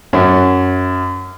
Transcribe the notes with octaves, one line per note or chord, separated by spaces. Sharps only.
F#2